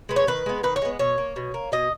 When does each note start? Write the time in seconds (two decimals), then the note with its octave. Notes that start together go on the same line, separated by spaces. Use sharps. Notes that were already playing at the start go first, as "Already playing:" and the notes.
0.09 G#3 B3
0.16 C#5
0.27 D#3 B4
0.46 G#3 B3
0.63 D#3 B4
0.76 C#5
0.82 G#3 B3
0.99 B2 C#5
1.18 A#3
1.36 B2
1.54 A#3
1.72 B2 D#5